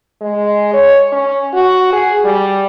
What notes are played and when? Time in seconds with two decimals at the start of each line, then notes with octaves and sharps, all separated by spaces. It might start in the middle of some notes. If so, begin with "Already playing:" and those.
0.21 G#3
0.73 C#5
1.12 C#4
1.53 F#4
1.93 G#4
2.25 G3